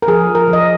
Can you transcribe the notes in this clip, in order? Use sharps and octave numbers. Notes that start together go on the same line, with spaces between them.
A#4
F3 G#4
A#4
F3
D#5